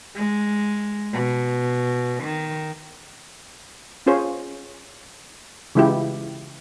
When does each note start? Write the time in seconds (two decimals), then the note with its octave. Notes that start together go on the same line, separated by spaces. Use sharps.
0.15 G#3
1.13 B2
2.24 D#3
4.06 C#4 F4 G#4 C5 C#5
5.75 C#3 E3 G#3 E4 F4 G4